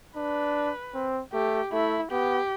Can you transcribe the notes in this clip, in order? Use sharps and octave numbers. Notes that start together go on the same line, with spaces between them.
D4 B4
C4
A3 G4
A3 E4
B3 G4